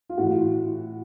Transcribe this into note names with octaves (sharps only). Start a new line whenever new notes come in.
F4
A2 E3 F#4